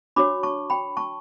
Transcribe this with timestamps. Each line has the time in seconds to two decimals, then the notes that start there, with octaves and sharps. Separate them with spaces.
0.16 D4 F#4 C#5 B5 D6
0.43 A5 C#6
0.70 G5 B5
0.97 A5 C#6